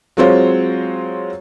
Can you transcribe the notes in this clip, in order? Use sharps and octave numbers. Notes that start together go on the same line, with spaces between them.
F#3 G#3 C4 F4 C5 C#5